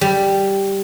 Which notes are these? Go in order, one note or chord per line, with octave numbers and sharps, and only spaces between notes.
G3